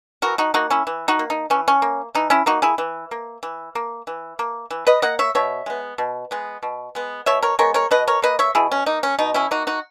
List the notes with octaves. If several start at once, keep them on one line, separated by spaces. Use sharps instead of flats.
E3 F#4 A#4
D#4 F#4
A#3 D#4 F#4
C#4 E4
E3
D#4 F#4
A#3
D#4
E3 C#4
C#4
A#3
E3 D#4
C#4 E4
A#3 D#4 F#4
E4 G#4
E3
A#3
E3
A#3
E3
A#3
E3
B4 D#5
A#3 D#5 F#5
C#5 E5
B2 C#5 E5
G#3 B3
B2
G#3 B3
B2
G#3 B3
B2 C#5 E5
A#4 C#5
G#3 B3 A#4 C#5
A#4 C#5
B2 B4 D#5
A#4 C#5
A#3 B4 D#5
C#5 E5
B2 E4 G#4
C#4
A#3 D#4
C#4
B2 D#4
C#4 E4
A#3 D#4 F#4
D#4 F#4